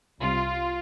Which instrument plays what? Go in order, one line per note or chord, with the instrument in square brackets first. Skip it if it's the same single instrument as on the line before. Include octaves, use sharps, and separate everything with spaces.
[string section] C2 C3 G3 F4